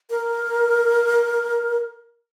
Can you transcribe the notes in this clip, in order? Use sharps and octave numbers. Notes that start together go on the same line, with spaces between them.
A#4